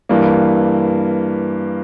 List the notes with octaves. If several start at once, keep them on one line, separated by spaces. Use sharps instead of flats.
G2 E3 A#3